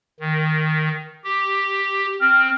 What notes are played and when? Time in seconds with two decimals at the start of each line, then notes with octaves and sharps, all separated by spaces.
0.20 D#3
1.24 G4
2.20 C4 F6